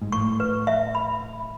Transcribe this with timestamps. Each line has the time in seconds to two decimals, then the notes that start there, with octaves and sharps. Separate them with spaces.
0.02 G#2
0.12 A2 C#6
0.40 B4
0.67 E5
0.95 B5